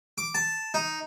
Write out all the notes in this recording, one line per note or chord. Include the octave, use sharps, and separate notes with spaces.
D6
A5
D#4